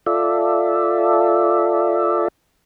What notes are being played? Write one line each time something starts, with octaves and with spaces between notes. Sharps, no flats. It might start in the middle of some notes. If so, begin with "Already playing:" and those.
F4 A4 D5 E5